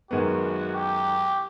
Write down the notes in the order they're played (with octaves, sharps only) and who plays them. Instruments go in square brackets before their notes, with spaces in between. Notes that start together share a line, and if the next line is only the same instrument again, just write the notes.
[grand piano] F#2 D#3 G#3 B3 [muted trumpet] F#4
[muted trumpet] G4